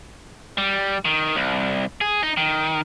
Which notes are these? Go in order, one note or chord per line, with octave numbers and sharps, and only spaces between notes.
G3
D#3
C2
G#4
D#4
D#3